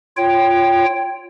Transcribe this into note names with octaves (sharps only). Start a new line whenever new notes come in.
F4 C#5 G5